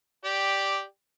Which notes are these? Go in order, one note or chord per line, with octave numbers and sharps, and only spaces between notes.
G4 D5 G5